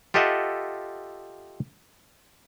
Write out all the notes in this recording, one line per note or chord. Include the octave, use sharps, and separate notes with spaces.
F4 G4 A4 D#5 E5 F#5